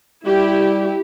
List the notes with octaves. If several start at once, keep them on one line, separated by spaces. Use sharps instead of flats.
G3 E4 G4